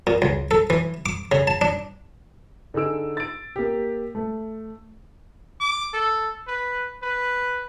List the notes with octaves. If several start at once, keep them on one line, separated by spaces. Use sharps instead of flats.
A#2
C#2
A4
E3
D6
C#3
A5
D4
D3 D#4 G#4 E6 D7
A6 D7
A#3 G4
A3
D6
A4
B4
B4